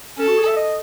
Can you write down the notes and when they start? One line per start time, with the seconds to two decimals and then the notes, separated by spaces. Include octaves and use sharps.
0.18 C#4 A4
0.28 F#4
0.38 G#4
0.47 E5
0.56 D#5